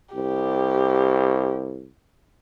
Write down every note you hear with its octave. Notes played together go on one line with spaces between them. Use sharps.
C2 G4